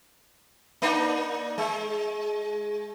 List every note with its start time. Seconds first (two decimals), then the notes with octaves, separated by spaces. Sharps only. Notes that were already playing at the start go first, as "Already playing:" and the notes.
0.82 A#3 D4 D#4
1.58 G#3